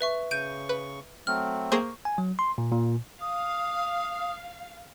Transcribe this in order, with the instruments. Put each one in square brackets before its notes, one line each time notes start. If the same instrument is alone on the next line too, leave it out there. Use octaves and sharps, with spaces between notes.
[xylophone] B4 E5 C#6
[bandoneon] C#3 C#6 [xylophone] G6 D#7 [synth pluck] D7
[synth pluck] B4
[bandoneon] F#3 A3 C4 [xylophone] F6
[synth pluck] A#3 G#4 C5 [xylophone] C#6
[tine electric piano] G#5
F#3
C6
A#2
A#2
[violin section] F5 [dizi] D#6